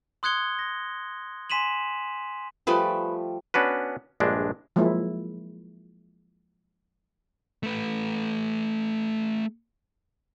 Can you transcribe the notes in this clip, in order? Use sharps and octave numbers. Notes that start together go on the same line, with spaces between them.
C6 D#6 F#6 G#6 C#7 G7
A#6
G#5 C6 B6 D#7 E7 F#7
F3 G3 A3 G#4 B4
B3 C#4 D4 F#4 B4
A#1 G2 G#3 D4
F3 F#3 G#3 A#3 E4
A3 B4